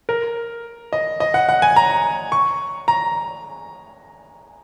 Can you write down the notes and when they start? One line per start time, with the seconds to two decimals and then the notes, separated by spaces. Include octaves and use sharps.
0.09 A#4
0.93 D#5
1.20 D#5
1.34 F#5
1.49 F#5
1.62 G#5
1.76 A#5
2.32 C#6
2.88 A#5